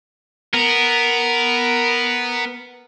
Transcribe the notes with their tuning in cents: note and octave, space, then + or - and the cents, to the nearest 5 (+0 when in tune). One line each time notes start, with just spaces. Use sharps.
B3 +0 A#4 +0